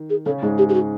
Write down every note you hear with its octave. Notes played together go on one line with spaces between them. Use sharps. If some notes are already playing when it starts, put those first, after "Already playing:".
Already playing: D#3
G#4
C#3 C#4 A4
G#2 G#3 G#4
G4
G4
F#4